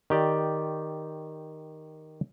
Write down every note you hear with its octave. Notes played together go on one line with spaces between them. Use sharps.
D#3 G4 D5